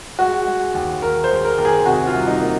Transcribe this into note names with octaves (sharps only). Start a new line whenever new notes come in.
G#3 F#4
G#3
D#2
D#2 A#4
C5
G#3
A#4
D#2 A#4
G#4
C3 F#4
F4
C2
D#4
A#3